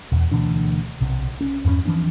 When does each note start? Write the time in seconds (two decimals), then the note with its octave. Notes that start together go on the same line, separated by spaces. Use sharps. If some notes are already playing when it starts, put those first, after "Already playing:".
0.12 E2 B2
0.32 D2 B2 E3 D4
1.01 B1 C3
1.41 C#4
1.65 E2 G2 A3 C#4
1.85 E3 F3 C4 D4